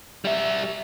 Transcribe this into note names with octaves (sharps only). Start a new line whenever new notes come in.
G3 E5